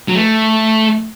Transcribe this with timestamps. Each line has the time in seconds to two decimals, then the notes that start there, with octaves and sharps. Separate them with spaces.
0.08 F#3
0.15 A3